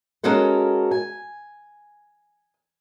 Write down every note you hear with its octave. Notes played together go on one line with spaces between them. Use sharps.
G#3 C#4 F#4 A4 A#4
G#5